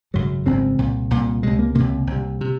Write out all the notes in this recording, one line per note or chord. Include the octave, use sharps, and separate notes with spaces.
G#1 F#2 C#3 F#3
G#1 F#2 C#3 C4
C2 A#2
C2 A#2
C#2 C3 G#3
A#3
C#2 C3 A#3
C2 C3
C3